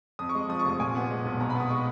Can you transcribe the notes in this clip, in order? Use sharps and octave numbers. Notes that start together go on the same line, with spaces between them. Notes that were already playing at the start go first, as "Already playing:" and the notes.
F2 D#6
C#6
G#3
F3 D#6
C#6
F1
A#2 G#5
B3
G#3
B1
B2 A#5
B5
B3 D#6
G#3 C#6